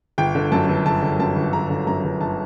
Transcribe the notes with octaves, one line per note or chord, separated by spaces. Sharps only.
G1 G5
D3
F#2 A5
G1
G1 A5
D3
F#2 A5
G1
G1 A#5
D3
F#2 A#5
G1
G1 A5